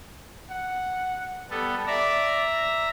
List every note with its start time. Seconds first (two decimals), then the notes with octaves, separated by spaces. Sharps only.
0.50 F#5
1.50 G3 B3 A4
1.87 D5 E5 A#5